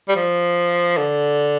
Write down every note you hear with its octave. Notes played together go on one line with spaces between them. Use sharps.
G3
F3
D3